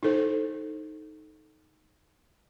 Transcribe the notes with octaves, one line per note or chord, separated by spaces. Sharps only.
D#4 E4 A4 C5